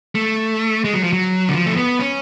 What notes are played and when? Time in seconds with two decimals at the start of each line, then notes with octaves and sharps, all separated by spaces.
0.15 A3
0.85 G#3
0.94 F#3
1.03 F3
1.13 F#3
1.49 D3
1.53 F3
1.66 A3
1.76 B3
1.99 C#4